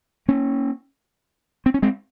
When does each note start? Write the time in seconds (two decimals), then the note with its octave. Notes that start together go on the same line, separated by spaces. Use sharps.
0.28 A#3 C#4
1.66 C4
1.74 C#4
1.82 G#3 C4